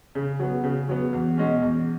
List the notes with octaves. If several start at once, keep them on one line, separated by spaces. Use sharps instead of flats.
C#3
F#3 B3
C#3
F#3 B3
E2
B2 G#3 C#4
E2